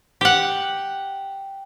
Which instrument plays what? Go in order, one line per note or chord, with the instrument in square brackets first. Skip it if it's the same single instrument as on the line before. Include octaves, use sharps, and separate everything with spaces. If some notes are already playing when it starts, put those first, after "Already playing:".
[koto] G4 F#5